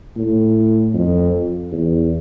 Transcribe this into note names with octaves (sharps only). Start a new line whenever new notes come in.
A2
F2
E2